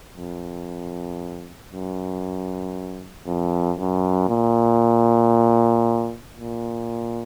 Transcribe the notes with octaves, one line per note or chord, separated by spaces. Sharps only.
F2
F#2
F2
F#2
A#2
A#2